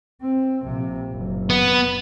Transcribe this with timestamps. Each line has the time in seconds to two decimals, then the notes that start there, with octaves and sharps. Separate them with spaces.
0.22 C4
0.63 A#1 C3
1.12 F#1
1.50 B3